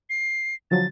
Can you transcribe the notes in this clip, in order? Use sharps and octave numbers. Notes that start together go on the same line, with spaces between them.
C7
D3 F3 F#3 A6